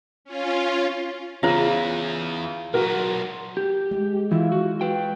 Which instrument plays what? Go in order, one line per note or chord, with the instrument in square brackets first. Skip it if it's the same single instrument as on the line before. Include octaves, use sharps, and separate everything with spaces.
[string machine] C#4 F4
[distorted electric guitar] E2 E3 [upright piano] C#3 [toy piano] F4 C5
[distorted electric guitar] B1 A#2 [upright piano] F#4 A#4
[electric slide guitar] G4
[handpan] G#3
[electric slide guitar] E3 E4 [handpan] F4
[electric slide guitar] F#4
B4 G5